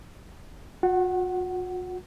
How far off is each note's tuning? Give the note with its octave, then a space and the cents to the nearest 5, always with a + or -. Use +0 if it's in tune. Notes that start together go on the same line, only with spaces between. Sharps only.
F#4 -45 F#5 +15